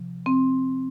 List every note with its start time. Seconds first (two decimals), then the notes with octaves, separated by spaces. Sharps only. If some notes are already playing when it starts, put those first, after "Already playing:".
Already playing: C3 F3
0.26 C4